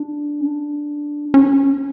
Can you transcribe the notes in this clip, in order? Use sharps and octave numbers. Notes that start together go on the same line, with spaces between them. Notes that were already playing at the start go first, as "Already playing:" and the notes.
Already playing: D4
C#4
D4
C#4